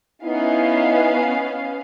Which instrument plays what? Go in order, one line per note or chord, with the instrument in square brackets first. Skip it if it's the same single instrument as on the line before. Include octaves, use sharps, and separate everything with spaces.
[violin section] B3 C#4 F5 [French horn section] D#4 E4